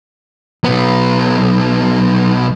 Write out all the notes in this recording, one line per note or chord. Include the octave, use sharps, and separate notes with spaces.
B1 B3